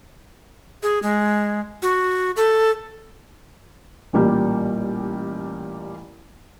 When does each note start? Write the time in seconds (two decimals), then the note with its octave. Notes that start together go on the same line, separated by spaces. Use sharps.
0.83 G#4
1.03 G#3
1.82 F#4
2.36 A4
4.13 A1 A#2 G3 A#3 G4